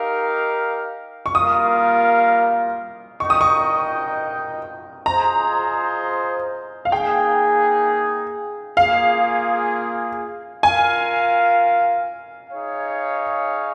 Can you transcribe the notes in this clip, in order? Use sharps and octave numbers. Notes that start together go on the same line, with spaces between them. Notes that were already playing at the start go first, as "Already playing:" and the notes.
Already playing: D#4 G4 A#4 F5
C#6
G3 A#3 F4 A#4 F5 D#6
D#4 A#4 D#5 G5 C#6
D#6
C#6
F4 G#4 C5 D#5 A#5
F5
A#3 D#4 G#4 G5
A#3 F4 G#4 F5
F4 A#4 F5 G#5
D#4 G#4 C#5 F5